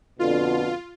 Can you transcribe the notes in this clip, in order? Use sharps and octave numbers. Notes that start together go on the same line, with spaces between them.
F2 B2 D3 F4